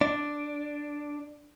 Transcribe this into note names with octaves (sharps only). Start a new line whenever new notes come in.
D4